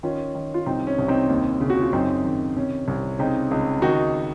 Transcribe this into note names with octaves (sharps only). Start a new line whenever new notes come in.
D#3 C#4 F4
D#3
F4
C2 C4 D#4
C#4
C2
C4 D#4
D#2
C#3
F#4
F4
F#2 C4 D#4
D#3
C3 C#4
C2
C#3 C4 D#4
C#2
D#3 D#4 F#4